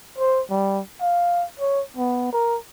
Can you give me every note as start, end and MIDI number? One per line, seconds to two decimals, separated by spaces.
0.18 0.42 72
0.50 0.81 55
1.01 1.45 77
1.60 1.82 73
1.97 2.28 59
2.33 2.58 70